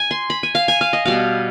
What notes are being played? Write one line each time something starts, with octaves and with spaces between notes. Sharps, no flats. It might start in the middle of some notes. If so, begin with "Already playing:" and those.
Already playing: G#5
C6
B5
G#5
F5
G#5
F5
D#5
B2 G3 B3 F5